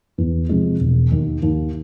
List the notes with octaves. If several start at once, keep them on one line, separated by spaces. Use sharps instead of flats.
E2
C3 F3 G#3
E1
D#2 D#3
D#2